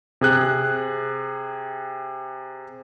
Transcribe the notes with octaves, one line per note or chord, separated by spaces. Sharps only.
C3 G#4 F#6